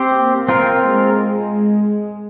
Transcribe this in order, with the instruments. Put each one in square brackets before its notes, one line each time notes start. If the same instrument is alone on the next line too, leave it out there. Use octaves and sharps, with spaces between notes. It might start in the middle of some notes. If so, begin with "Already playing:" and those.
Already playing: [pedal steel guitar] C4 G4 C5
[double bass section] A#3
[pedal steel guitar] C4 F4 A#4
[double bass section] G#3